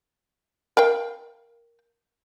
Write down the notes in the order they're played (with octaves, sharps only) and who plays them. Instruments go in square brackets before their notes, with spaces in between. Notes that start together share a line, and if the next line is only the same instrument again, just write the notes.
[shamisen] A#4 F5 G5